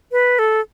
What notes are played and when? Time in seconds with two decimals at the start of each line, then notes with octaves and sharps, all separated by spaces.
0.12 B4
0.39 A4